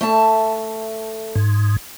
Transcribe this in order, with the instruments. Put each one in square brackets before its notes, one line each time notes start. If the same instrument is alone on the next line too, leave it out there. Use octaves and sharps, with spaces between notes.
[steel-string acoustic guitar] A3 E5 A5
[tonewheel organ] G#2